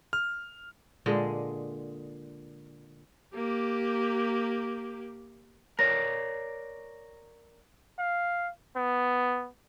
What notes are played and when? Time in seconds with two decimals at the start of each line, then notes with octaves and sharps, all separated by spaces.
0.13 F6
1.06 A#2 D3 G#3 D#5
3.34 A#3 G4
5.79 A#4 C#5 D5 A#6
7.99 F5
8.76 B3